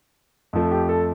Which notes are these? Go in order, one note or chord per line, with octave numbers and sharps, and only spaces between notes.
F2 F3 A3
G4
A4